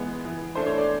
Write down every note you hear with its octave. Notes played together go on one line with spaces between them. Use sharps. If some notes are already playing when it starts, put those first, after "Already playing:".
Already playing: E3 G#3 B3
E3
A3 D4 C5
C#5
D5